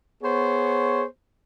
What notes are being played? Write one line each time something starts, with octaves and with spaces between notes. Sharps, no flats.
B3 G#4 C5 C#5